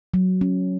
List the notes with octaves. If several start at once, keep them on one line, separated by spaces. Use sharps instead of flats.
F#3
C#4